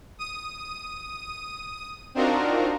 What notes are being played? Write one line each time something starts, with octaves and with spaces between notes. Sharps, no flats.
D#6 D#7
C4 D4 D#4 F4 F#4 A#4